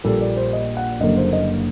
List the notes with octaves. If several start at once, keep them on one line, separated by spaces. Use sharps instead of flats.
A#1 A#2 G3 A#3 A4
D5
C5
D#5
F#5
F#1 F#2 D3 G3 A#3 D#5
C5
D#5